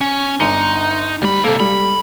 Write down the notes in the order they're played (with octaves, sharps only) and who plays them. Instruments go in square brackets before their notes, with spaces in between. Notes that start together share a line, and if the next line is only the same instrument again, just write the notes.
[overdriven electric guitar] C#4
[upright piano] G1 D4 C#7 [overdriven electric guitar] D#4
[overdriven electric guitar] D2 B5 [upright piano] G3
[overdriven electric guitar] C3 A#3 [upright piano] A4
[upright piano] G3 [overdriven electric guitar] B5